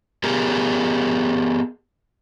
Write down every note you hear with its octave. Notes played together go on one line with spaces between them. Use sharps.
B3 G4 G#4 A#4